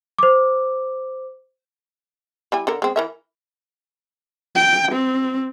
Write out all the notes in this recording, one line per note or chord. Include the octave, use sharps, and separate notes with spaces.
C5 D6
G3 E4 G#5
D3 A4 A#4
G#3 C4
E3 A#4 E5
G5
C4